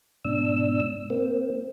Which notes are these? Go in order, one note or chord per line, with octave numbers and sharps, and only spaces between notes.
G#2 B2 D4 E6
A#3 C4